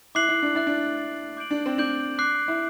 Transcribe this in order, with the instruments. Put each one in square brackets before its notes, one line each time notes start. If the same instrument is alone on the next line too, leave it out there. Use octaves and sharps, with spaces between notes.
[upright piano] E4 [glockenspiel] D6 F#6 C7 F#7
[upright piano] E4
D4
[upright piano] E4 [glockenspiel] F#6 A6 C7
[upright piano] D4
[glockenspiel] F#6 A6 C7
D6 G6 D7 F#7
[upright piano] D4
C4
[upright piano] D4 [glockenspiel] D6 G6 D7 F#7
[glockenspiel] D6 F#6 C7
[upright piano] E4